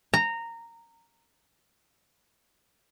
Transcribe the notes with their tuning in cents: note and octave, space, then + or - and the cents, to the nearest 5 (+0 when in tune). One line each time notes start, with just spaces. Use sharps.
A#5 -15